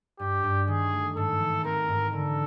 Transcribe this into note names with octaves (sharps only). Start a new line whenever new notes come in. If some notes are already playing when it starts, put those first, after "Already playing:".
G2 G4
G2
D#3 G#4
A3
G#2 A4
E3
C4 A#4
G#2
D3 A4